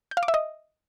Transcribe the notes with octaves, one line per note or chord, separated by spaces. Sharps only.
G6
F5
D6
E5
D#5